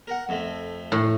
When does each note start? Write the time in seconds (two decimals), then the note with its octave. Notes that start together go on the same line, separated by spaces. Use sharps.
0.07 A#4 F#5
0.29 F2 A3
0.92 A2